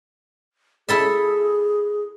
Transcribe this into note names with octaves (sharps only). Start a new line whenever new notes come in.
E4 G#4 A4 E5